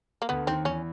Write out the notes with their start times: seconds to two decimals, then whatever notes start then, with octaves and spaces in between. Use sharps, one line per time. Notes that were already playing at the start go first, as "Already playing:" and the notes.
0.22 A#3
0.29 D2 D3 B3
0.47 D#2 D#3 C4
0.65 E2 E3 C#4